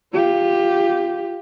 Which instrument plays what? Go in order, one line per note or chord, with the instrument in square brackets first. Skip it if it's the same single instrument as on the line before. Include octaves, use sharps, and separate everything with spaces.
[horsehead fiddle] F4 G4